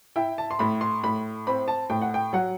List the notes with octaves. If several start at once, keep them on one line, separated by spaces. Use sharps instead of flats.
E4 G5
A5
C6
A2 B5
C6
A2 B5
C4 B5
A5
A2 G5
F#5
G5
F#3 F#5